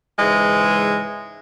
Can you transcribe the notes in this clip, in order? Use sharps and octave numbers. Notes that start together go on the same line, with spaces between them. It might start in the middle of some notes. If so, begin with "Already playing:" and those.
G#2 C#3 E3 G#3